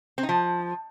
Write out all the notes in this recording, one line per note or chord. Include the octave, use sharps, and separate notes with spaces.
C4
D#4
F3